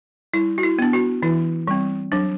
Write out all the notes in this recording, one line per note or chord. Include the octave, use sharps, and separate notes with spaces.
G3 E4
F#4
E4
B3 D4
F#4
E3 E4
G3 C4
F#3 D4